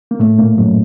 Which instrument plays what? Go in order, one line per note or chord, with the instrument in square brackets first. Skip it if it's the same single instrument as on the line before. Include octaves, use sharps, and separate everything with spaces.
[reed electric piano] A#3
A2 A3
A#2 A#3
F#2 F#3